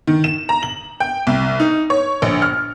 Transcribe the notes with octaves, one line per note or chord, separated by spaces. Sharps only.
D#3
E7
A#5
F#7
G5
C2
D#4
C#5
A#1
F6